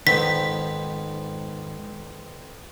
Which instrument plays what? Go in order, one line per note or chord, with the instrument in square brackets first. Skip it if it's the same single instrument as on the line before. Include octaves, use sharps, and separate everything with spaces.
[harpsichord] F2 B3 C4 [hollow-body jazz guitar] G#2 D#3 [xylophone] B6